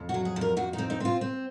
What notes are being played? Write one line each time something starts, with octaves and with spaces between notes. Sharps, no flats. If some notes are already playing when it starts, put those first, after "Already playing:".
Already playing: F2
F#4
F#3
G#4
F2
A#4
F2 F#4
D#4
C4
D#4
C4 F4
C4